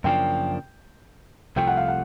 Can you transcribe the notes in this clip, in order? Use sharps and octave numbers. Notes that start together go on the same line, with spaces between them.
F#2 C#3 F3 A#3 D4 G5
C2 C3 F3 A3 G5
F#5
F5
F#5